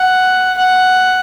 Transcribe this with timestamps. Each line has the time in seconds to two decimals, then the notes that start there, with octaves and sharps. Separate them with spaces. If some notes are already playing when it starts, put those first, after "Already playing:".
Already playing: F#5
0.57 F#5